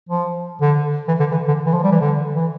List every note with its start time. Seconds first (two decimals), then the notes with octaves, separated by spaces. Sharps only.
0.09 F3
0.61 D3
1.08 E3
1.20 D3
1.32 E3
1.48 D3
1.66 E3
1.74 F3
1.83 G3
1.91 E3
2.00 D3
2.35 E3